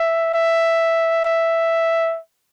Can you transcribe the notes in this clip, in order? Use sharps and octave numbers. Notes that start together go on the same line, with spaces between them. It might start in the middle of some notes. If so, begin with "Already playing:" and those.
Already playing: E5
E5
E5